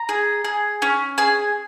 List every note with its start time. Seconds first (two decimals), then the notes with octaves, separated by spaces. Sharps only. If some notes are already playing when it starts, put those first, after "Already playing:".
Already playing: A#5
0.09 G#4
0.44 G#4
0.82 C#4
1.18 G#4 G#5